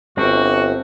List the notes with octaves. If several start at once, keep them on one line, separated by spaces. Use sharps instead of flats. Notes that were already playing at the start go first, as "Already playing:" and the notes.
G1 G3 C4 D4 F#4